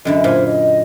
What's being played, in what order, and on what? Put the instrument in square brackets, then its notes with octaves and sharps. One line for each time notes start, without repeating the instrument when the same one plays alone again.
[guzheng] F#2 D3 E4 [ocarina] D#5
[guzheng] A#2 G#5 [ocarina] C5
[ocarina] D#5